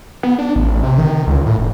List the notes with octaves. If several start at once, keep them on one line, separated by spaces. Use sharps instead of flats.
B3
D4
A1
C3
D#3
C#2
A2
F1